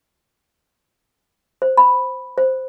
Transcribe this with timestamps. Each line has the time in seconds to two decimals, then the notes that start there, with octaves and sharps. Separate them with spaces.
1.62 C5
1.77 B5
2.38 C5